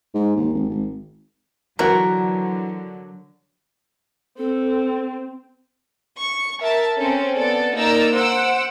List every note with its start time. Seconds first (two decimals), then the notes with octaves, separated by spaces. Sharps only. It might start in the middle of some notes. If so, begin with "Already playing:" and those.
0.14 G#2
0.36 D#2
0.53 G#1
0.69 G#1
1.79 D3 E3 F#3 F#4 A#4
4.38 C4 A4
6.18 C#6
6.60 A#4 E5 A5
6.97 C4 C#4 A4
7.36 B3 A4 D5
7.75 A#3 D#4 D5 A#5 E6
8.14 C5 F#5 E6 D7